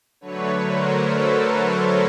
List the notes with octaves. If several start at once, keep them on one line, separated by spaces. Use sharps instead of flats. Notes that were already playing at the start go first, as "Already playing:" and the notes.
D3 F#3 A3 B4 C#5
A#4 C5
A4 B4
A#4 C5